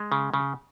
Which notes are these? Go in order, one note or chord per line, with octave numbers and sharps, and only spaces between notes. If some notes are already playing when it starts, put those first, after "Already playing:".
Already playing: G#3
C#3
C#3